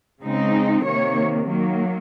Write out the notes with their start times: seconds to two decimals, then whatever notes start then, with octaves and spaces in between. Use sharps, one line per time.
0.22 C#3 G#3 C4 D#4
0.85 C3 D#3 A#3 C#5
1.48 D#3 F#3 A#3